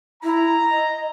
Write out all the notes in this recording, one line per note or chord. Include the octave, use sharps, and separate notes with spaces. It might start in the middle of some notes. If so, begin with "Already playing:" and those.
E4 A#5
D#5